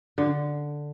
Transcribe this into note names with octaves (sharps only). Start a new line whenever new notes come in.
D3